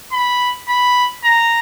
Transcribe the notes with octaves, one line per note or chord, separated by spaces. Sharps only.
B5
B5
A#5